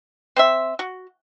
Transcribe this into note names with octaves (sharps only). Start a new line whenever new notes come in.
C4 C5 E5
F#4